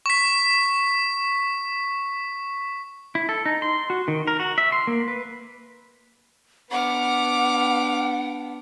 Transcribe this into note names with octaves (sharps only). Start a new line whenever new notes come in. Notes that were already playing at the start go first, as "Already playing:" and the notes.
C#6 B6
E4
A4
D#4
C6
F#4
D#3
A#4
F#4
E5
C6
A#3
B4
B3 D4 F#5 D6 F6